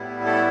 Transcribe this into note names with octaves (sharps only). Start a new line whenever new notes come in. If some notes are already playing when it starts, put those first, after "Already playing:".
Already playing: A2 G3 B3 E4
A3 A4